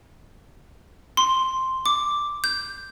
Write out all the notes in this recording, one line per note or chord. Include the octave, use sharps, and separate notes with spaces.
C6
D6
G6